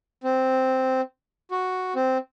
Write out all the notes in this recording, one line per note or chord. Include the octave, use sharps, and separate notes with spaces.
C4
F#4
C4